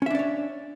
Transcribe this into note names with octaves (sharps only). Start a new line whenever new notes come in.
C#4 D4 C#5 D5 E5